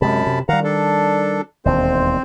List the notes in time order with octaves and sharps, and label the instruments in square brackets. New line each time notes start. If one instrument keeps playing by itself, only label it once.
[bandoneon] F#2 A5 B5 [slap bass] C3 G#3
[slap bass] C3
[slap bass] D#3 G3 [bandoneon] F5 F#5 A#5
[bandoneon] D4 A4
[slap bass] E1 D#2 [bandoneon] C4 C5